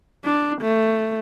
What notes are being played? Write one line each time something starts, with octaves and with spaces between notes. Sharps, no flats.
D4
A3